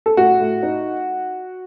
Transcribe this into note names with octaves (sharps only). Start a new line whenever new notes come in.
A4
A2 F#4
A2
D#4